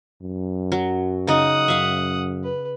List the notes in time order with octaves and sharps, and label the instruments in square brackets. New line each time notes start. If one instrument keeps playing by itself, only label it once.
[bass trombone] F#2
[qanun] F#3
[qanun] C#3 D#4 [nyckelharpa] F#5 D#6
[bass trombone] F#2 [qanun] E5 F5
[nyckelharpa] B4